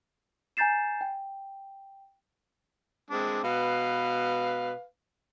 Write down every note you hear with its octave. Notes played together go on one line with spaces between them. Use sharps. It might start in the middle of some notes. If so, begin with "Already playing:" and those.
G#5 A#5 G6 A6 C7 E7
G5
G#3 C4 D4
B2 B4 F5